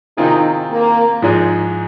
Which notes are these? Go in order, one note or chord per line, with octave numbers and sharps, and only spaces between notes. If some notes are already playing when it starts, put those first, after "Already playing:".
C3 D#3 C4 D#4 F4 G#4
A#3
G#2 F3 G#3 D#4 G#4